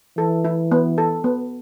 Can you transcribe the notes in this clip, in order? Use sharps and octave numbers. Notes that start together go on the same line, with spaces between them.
E3 A4
E4
B3
A4
B3